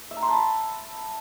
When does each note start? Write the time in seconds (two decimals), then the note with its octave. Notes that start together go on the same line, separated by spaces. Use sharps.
0.11 E5
0.17 A#5
0.22 C6
0.28 A5
0.34 B5